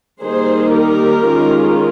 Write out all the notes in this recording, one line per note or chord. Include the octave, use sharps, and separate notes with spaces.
D#3 G3 A#3 D#4 G#4 C5
G4 A#4
D#3 G#3 C#4 F4